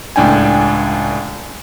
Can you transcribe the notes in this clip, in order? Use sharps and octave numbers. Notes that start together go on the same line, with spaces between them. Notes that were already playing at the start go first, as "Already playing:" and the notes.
C#2 A2 D4 G5 G#5